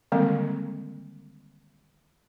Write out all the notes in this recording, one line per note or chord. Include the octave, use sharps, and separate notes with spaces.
D3 D#3 G3 G#3 A#3 C4